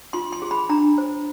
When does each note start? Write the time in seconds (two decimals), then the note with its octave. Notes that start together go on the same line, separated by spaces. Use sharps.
0.13 F4 C6
0.32 C6
0.42 G#4
0.51 B5
0.69 D4 A#5
0.98 C5